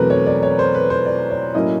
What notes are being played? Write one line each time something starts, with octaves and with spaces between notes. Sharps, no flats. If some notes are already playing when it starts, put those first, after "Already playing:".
Already playing: E2 B2 F#3 A3 C4 A#4 B4
C#5
D5
C#5
C5
B4
C5
D5
C#5
A2 F#3 A#3 C#4 E4 D#5